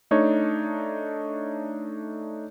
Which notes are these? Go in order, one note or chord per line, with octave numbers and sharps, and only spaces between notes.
A3 D4 D#4 C#5